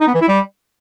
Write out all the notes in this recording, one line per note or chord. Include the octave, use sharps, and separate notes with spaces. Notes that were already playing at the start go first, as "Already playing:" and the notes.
D#4
B3
E3
E4
G3